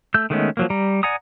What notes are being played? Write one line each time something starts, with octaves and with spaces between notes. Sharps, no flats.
A3 E6 G6
D#3 G#3 A3 B3 C#4
F3 F#3 A#3
G3 A#5
D5 F#5 G#5 A#5 D#6